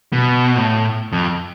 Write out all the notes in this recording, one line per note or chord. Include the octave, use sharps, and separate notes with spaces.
B2
A2
F2